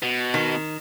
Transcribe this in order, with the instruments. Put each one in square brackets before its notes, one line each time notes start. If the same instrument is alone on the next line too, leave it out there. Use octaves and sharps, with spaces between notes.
[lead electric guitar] B2
[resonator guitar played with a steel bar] D#3